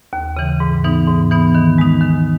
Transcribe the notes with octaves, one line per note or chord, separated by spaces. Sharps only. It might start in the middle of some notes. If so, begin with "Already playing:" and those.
D#2
C#3 E3
G#2
E3 B3 D#4
G#2
E3 B3 D#4
D#3
G#3 D#4
D#3